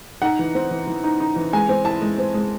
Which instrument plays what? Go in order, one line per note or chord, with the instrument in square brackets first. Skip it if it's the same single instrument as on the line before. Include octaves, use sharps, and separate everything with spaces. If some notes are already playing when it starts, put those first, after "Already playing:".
[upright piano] D#4 F#5
E3
C4
E3
E3
D#4
D#4
E3
G#3 G#5
C4
E4 A5
G#3
C4
G#3